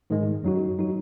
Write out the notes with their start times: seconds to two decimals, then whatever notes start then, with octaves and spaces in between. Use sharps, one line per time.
0.10 G#2 D#3 G#3
0.43 F#2 F#3 D#4 F#4
0.79 F#3 D#4 F#4